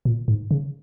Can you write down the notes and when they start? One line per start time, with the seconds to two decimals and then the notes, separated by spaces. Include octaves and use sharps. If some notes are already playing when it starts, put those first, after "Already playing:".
0.05 A#2
0.28 G#2
0.51 C#3